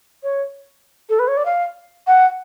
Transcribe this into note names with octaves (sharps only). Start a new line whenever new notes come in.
C#5
A4
B4
C#5
D5
F5
F#5